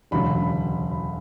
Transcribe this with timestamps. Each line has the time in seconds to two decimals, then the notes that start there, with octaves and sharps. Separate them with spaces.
0.11 E1 D2 C#3 F#3 B5
0.91 B5